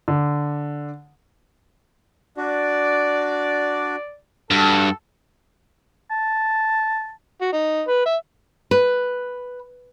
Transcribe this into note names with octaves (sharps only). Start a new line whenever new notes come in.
D3
D4 F#4 D5
G2 F#4 A4
A5
F#4
D#4
B4
E5
B4